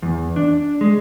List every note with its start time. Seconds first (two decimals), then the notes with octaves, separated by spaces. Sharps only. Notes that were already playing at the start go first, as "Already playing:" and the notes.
0.02 E2
0.36 D4
0.81 G#3